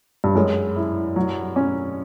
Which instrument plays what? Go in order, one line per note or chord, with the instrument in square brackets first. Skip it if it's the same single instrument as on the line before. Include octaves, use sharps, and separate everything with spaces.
[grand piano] G2
[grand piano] F#2 [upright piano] G#3
[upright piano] E4
F#3
C#4